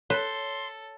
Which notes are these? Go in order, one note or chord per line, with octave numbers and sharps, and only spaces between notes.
A4 B4 C#5 C6